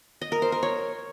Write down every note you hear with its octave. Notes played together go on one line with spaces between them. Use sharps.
D#5
A#4
C5
A#4
C#5